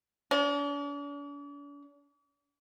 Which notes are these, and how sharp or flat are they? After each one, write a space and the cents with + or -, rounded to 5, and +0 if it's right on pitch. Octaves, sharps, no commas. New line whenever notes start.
D4 -45